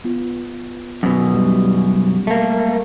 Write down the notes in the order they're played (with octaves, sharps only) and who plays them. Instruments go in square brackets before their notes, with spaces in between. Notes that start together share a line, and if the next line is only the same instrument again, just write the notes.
[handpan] B3 F4
[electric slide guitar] F#2 B2
[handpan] G3
[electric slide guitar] A3 A#3